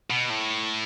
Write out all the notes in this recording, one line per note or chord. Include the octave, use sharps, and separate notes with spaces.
B2
A2